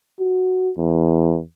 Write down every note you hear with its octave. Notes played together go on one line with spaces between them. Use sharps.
F#4
E2